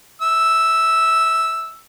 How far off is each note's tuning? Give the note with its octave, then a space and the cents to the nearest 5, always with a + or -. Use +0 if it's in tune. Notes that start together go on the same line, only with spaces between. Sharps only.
E5 -30 E6 +0